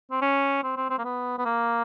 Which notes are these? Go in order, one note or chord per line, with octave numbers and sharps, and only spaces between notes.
C4
C#4
C4
C4
C4
A#3
B3
B3
A#3